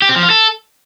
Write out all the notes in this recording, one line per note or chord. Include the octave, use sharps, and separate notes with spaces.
G4
C4
F3
F4
A4